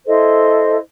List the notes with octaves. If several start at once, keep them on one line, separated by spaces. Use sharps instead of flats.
E4 A4 C5 D#5